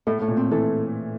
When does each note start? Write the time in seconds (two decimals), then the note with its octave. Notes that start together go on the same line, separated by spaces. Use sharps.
0.07 A2 A3
0.22 A2
0.28 A#2
0.37 C4
0.51 E3 A4